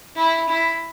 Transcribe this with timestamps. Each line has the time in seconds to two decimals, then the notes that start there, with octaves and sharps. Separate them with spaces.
0.16 E4
0.48 E4